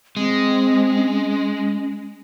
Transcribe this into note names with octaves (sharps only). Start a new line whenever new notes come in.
G#3 C4
C#4